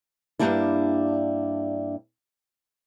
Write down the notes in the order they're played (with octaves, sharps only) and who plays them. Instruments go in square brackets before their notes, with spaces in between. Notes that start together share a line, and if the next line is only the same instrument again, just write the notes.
[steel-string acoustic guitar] G2 F#3 G3 A#3 D4 E4